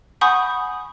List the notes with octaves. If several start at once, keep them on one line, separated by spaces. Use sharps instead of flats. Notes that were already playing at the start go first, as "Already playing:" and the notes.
F#5 G#5 B5 C#6 D#6 G6